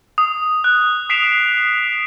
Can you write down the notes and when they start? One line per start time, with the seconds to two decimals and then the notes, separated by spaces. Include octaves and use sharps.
0.18 D#6
0.64 F#6
1.10 D#6 B6 C7 D7 E7 F7